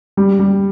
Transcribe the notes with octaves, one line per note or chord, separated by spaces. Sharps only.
G3
G3